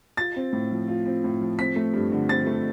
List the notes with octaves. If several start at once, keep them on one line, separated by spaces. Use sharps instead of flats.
F4 A6
C4
A2
F3
F4
C4
A2
F3
C4 B6
A3
G2
D3
C4 A6
A3